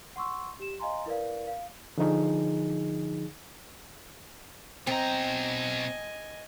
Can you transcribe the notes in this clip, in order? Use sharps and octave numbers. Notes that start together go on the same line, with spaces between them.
F#5 C6 C#6 E6
G4 E7
D#5 F5 G#5 A#5 C6
E4 A#4 B4 D5 F5
F5
D3 F3 D#4 G#4
B2 C4 D#5 G5 G#5 A#5